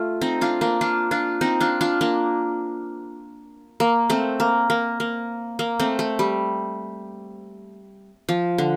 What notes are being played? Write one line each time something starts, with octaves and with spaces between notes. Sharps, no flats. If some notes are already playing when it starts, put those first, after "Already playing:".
Already playing: A3 F4
C4 D#4
D4 F4
A#3 D4
D4 F4
D4 F4
C4 D#4
D4 F4
D4 F4
A#3 D4
A#3
A3 C4
A#3
A#3
A#3
A#3
A3 C4
A3
G3
F3
D3